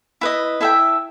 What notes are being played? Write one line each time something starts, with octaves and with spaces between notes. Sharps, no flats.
E4 B4 D#5
E4 A4 E5 G5